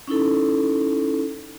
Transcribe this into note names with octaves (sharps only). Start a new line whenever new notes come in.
C#4 D#4 E4 A4